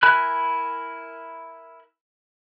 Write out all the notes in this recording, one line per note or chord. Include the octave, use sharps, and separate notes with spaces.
E4 A#4 G#5 B5 F#6